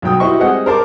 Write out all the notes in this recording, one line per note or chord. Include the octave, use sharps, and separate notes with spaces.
B1 F#3 G5 D#6
E4 F#4 G4 C5 D#5 C#6
G3 G#3 C4 G#4 D#5 F#5
A#4 C5 A5 D6